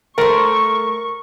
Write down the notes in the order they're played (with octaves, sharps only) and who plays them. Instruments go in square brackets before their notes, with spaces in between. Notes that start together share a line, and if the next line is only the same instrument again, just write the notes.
[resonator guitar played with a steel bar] A3 C5 [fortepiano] A#4 [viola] C#6